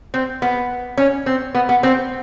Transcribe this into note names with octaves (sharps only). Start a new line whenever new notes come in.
C4
B3
C#4
C4
B3
B3
C4